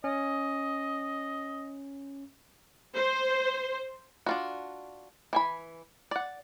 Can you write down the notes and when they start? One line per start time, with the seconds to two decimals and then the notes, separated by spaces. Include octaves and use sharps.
0.04 C#4 D#5
2.95 C5
4.26 D4 F4 F#4
5.33 E3 G#5 B5
6.11 D5 F#5